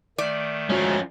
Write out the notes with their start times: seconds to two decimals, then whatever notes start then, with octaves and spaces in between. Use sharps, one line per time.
0.18 D#3 A3 D5
0.70 F3 G#3 C#4 F#4